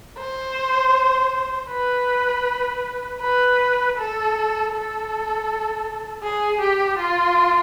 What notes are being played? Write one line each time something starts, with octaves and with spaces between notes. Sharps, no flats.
C5
B4
B4
A4
A4
G#4
G4
F4